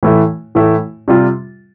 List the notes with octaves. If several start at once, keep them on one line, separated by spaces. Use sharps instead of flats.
A2 E3 A3 E4
A2 E3 A3 E4
C3 G3 C4 F4